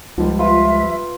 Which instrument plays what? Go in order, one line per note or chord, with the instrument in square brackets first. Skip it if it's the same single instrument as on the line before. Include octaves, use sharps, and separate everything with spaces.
[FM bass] C#2 [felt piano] F3 G3
[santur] F4 B4 [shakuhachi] E5